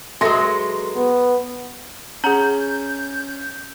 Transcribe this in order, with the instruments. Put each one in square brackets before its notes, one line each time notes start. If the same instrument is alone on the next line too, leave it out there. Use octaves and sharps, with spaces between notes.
[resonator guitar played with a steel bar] F#3 G#3 [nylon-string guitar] A4 B4 E5 [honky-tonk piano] C6 A#6
[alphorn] B3
[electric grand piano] C#4 [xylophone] G#4 F#5 F#7 [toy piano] A#5 [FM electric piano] G6